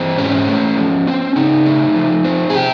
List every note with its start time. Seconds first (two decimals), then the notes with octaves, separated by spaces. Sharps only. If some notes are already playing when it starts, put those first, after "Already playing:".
Already playing: E3 C4
0.18 G#2 C#4
0.48 A3
0.77 F3
1.07 C4
1.36 C#3 D#4
1.66 A3
1.96 F3
2.24 C4
2.50 G#4
2.55 G4